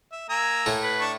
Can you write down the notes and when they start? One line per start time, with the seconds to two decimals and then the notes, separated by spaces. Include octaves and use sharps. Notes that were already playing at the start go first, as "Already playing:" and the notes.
0.12 E5
0.30 A#3 G#5 A#5 E6
0.66 A2 A3
0.83 B4
1.01 D4 A5 C#6